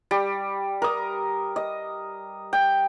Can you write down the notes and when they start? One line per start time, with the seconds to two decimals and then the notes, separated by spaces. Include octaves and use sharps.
0.11 G3
0.82 A#4 D#6
1.56 D#5
2.53 G5